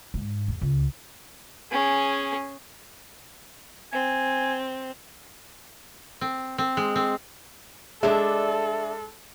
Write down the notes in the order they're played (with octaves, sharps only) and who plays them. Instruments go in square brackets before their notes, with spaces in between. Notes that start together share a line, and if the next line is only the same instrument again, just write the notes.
[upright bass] G#2
E2
C#2
[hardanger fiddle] C#4 G#4
[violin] C4 [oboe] G#5
[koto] C4
C4
G#3
C4
[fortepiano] G#3 [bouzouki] D4 E5 [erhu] A4